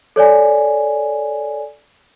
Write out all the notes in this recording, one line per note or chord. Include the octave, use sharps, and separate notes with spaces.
A4 C#5 D5 G#5